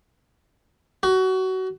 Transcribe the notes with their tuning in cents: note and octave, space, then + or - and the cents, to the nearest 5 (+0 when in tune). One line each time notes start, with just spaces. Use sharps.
F#4 +25